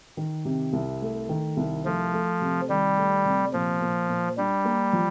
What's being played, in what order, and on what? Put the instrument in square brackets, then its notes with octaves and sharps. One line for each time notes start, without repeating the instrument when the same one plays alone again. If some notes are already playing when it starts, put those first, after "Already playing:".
[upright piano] D#3
C3
C2
A3
D#3
C2
[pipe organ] F3 [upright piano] A3
[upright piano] A3
C3
[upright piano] D#3 [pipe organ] G3
[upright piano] A3
C3
[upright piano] A#2 [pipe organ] F3
[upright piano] A#2
A#2
[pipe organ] G3 [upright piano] D4
[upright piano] A#3
F3